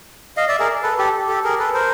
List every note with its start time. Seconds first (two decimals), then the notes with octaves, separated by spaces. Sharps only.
0.37 D#5 F5
0.48 D5 E5
0.60 G#4 A#4
0.83 A4 B4
0.98 G4 A4
1.28 G4 A4
1.44 G#4 A#4
1.59 A4 B4
1.74 A#4 C5